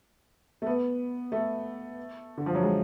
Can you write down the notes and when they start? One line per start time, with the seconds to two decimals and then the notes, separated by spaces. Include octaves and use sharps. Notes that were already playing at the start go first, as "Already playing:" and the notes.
0.62 A3
0.66 B3
1.32 A3
2.38 D3
2.46 F3
2.55 F#3
2.62 G#3